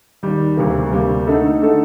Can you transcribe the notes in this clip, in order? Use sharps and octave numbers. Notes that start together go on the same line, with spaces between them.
D#2 D#3 G3
D2 C3 G3 A#3
D2 C3 G3 A#3
D3 A3 D#4 A4
D3 A3 D#4 A4